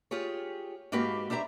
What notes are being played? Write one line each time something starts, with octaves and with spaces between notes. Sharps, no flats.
F4 G4 G#4 C#5
G#2 A#3 F#4 G4 B4 F5
D4 G4 C5 E5 A#5